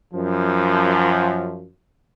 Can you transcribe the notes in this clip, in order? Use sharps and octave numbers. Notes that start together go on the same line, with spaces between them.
F#2 F3